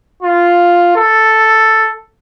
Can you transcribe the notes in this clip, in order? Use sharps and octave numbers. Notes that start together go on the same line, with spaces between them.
F4
A4